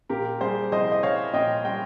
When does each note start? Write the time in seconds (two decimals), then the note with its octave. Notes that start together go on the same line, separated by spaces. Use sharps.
0.09 A#2 G4 A#4
0.41 G3 G#4 C5
0.72 C2 C5 D#5
0.92 D#5
1.03 C2 C#5 F5
1.33 A#2 D#5 G5
1.65 G3 G5